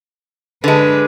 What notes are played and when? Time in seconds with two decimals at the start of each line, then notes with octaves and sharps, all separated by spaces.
0.64 D3 G#3 B4